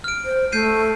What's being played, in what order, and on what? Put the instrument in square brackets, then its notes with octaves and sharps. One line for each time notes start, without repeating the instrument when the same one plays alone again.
[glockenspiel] F6 D7
[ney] C5
[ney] A3 [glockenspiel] G6 C7 D#7